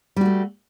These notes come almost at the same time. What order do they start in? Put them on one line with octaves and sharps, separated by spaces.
G3 F#4 A3